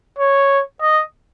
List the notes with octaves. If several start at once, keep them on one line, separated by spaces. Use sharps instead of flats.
C#5
D#5